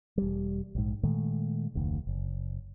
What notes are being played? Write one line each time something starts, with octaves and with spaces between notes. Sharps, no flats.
E1 G3
A#1 G#2
A#2 D#3 G#3 A3
F1 D2
F#1